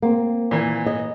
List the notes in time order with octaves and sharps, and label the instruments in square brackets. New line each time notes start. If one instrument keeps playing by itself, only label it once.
[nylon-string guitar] A#3 C4
[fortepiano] A#2 E3
[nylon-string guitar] D#5